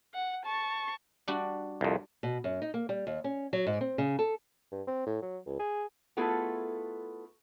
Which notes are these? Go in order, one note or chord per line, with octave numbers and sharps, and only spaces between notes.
F#5
A5 C#6
G3 D4 F#4
C2 F2
B2
F#2
D#4
A#3
G3
D#2
C#4
F#3
G#2
C4
C#3
A4
G2
C4
A2
F#3
C#2
G#4
A3 B3 E4 F4 G#4 A4